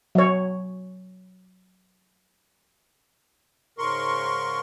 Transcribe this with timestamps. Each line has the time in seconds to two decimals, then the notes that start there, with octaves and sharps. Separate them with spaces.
0.15 F#3 C#5
3.78 G#2 C#3 A#4 C6 C#6